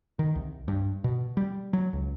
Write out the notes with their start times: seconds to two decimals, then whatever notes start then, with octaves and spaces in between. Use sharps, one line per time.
0.19 D#3
0.35 C2
0.68 G2
1.04 B2
1.37 G3
1.73 F#3
1.93 C#2